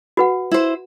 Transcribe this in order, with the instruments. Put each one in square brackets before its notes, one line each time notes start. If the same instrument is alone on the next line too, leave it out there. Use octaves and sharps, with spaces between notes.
[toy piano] F#4 B4 F#5
[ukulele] E4 C5